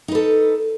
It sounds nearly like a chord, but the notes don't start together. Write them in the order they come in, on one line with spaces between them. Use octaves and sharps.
D#4 B4 A4